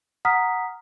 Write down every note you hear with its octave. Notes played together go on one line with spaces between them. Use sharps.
F#5 A#5 D#6 F6 B6